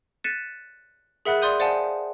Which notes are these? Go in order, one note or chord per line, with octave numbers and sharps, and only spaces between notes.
F#6 A6 B6 C#7 D#7 E7
G#4 A#4 E5 F#5 B5 F#6
D5 C6 D#6 G6 D#7
C5 D5 F5 F#5 G#5 A5